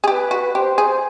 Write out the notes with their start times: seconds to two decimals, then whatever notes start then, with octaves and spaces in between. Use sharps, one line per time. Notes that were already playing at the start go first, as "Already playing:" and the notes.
0.04 G#4
0.08 G4 B4
0.31 F#4
0.54 G4 C5
0.78 G#4